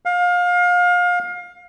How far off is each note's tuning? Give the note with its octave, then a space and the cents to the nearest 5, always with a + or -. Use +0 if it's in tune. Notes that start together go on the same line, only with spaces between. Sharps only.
F5 +30